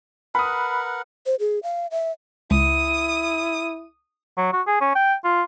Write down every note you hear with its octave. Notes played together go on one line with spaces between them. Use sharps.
A#4 B4 F#5 B5 D#6
C5
G#4
F5
E5
C#2 E4 D#6
F#3
F#4
G#4
C#4
G5
F4